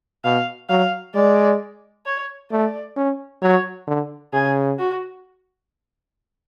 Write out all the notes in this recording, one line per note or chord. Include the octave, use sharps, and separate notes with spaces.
B2 F5
F#3 F5
G#3 D5
C#5
A3 D5
C#4
F#3 C#5
D3
C#3 G#4
F#4